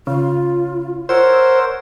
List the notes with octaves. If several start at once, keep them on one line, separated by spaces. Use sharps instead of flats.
C#3 F4
A#4 C5 C#5 F#5 E6